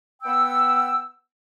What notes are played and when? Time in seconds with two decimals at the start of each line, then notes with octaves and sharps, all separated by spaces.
0.22 B3 F#5 G5 E6